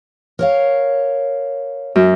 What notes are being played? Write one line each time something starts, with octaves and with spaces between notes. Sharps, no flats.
A#4 C#5 F5
F#2